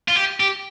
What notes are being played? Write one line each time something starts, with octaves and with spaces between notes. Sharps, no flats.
F4
G4
G4